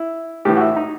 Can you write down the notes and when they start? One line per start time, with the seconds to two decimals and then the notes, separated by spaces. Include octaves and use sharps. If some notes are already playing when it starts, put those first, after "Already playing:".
Already playing: E4
0.45 A2 E3 G4
0.57 F#4
0.61 E4
0.76 D#4